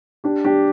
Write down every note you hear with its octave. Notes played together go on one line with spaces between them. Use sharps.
D4 G4
D4 G4